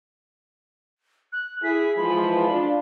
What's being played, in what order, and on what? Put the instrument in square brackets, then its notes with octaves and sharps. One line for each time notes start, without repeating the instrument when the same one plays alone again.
[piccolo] F#6
[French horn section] E4 G#4 [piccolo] B6
[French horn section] E3 F3 G#3 [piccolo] B5
[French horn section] D4 F4